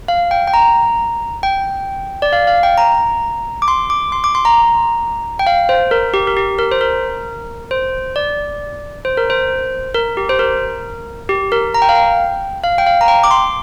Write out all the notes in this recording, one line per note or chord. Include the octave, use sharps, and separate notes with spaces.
F5
G5
G5
A#5
G5
D5
F5
F5
G5
A#5
D6
C6
D6
C6
D6
C6
A#5
G5
F5
C5
A#4
G4
A#4
G4
A#4
C5
A#4
C5
D5
C5
A#4
C5
A#4
G4
C5
A#4
G4
A#4
A#5
G5
F5
G5
F5
G5
F5
A#5
G5
D6
C6